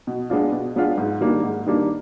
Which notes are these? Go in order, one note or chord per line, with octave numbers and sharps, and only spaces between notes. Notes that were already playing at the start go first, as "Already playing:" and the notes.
B2
G#3 B3 D4 F4
B2
G#3 B3 D4 F4
G#2
D#3 G3 A#3 D4
G#2
D#3 G3 A#3 D4